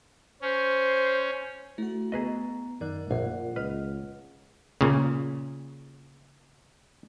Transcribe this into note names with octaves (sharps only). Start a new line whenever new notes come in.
C#4 C5
A3 E4 F#4
B3 G#4 B4 D#5 A#5
F#2 D#3 A#4 D5 F#6
A#1 A#2 F#5
C#2 B4 D#5 F6
A#2 C#3